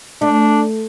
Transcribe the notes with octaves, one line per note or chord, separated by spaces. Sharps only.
A3 D4